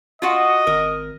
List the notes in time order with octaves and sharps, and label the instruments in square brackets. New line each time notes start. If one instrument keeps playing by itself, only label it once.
[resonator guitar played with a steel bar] F4 F#4 F#5 [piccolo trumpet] D#5
[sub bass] G#1 [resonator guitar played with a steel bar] A#4